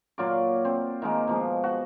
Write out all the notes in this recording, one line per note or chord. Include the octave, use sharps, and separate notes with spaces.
A#2 F#3 F4 D5
C4
D#3 G#3 A#3
B2 F3 G#3
F#4